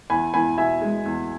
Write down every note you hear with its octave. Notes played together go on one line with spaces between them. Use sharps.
E2 G#5 B5
E2 G#5 B5
B2 E5 G#5
G#3
E2